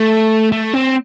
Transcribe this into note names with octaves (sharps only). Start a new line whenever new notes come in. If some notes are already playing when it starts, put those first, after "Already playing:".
Already playing: A3
A3
C4